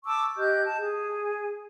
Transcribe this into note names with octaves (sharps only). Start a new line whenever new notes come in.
A5 C#6 D6 E6
G4 D#5 F#6 G6
A5
G#4